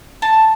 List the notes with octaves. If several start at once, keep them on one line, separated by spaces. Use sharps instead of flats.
A5